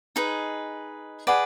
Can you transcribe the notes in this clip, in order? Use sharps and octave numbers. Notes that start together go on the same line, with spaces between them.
D#4 G#4 B4
G#4 B4 D5 F#5